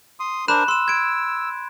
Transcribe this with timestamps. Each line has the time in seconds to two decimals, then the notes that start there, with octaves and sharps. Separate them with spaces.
0.20 C6 D#6
0.48 D4 A#4 C5 B5 F#6 E7
0.68 C6 E6 E7
0.88 G#6 D7